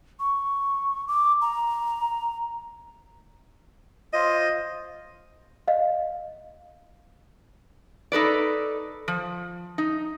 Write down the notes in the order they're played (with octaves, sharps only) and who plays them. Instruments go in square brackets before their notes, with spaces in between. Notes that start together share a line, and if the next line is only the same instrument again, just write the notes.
[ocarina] C#6
D6
A#5
[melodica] F4 C5 [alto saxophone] D#5
[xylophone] D#5 F5
[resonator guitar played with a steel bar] D#4 A4 B4 D5
F3
D#4